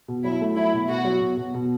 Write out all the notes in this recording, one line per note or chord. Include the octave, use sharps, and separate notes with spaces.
B2
F#3 E4
A3
F#3 E4
B2
B2 F#4
F#3
B2
B2
B2